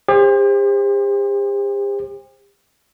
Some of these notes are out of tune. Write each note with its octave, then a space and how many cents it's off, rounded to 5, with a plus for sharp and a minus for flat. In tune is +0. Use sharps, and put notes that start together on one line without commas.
G4 +40 C5 +15